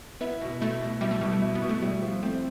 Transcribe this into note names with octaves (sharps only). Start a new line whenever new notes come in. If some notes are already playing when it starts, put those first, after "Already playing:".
B3 E4
B2
A3 E4
B2
G3 E4
A3
B2 G3
A3
E4
B3
B2
A3
G3 E4
F3
A3 C4